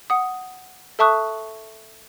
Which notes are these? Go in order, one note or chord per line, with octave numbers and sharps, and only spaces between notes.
F#5 D#6
A4 E5 A5 C#6 D#6 F#6